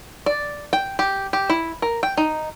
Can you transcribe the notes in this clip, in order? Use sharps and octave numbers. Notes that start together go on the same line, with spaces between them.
D5
G5
G4
G4
E4
A#4
G5
D#4